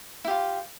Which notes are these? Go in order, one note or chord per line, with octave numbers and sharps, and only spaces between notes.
E4 F4 G4